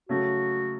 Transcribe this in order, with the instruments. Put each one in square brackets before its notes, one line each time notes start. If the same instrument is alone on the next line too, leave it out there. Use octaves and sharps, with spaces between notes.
[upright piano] C#3 F#3 A3 [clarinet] F#4